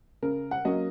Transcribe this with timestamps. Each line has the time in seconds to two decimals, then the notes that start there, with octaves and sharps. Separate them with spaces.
0.22 C#3 A#4
0.51 F#5
0.65 F#3 A#3 C#4 D#5